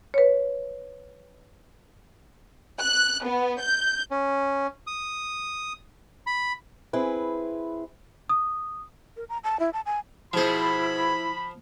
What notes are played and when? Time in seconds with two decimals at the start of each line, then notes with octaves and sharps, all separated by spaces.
0.14 B4 C#5
2.79 F#6
3.25 B3
3.61 G6
4.10 C#4
4.87 D#6
6.27 B5
6.93 C4 E4 G#4 B4
8.29 D#6
9.17 A#4
9.29 A#5
9.44 A5
9.60 E4
9.73 A5
9.86 G#5
10.33 B2 F3 E4 G#4 C5 B5